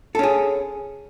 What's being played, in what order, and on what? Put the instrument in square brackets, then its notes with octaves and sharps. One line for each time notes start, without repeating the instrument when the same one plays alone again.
[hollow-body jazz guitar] A4
C#4
G#4